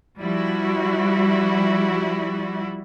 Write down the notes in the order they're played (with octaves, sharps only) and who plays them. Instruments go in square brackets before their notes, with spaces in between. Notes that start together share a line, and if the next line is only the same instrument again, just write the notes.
[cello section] F3 G3 E4 F#4